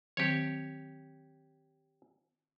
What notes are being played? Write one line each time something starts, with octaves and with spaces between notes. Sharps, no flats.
D#3 F#3 C4 G4 C#5